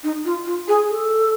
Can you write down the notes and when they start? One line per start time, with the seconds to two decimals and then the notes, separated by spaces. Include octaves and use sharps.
0.03 D#4
0.24 F4
0.45 F4
0.67 G#4
0.88 A4